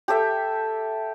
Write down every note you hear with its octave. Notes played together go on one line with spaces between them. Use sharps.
G4 A4 E5